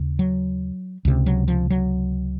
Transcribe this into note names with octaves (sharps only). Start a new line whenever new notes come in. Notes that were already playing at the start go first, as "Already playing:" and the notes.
Already playing: D#2 C#3
F#3
C#2 C3
F#3
F3
F#3